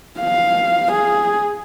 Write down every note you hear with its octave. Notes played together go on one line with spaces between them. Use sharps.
F5
G#4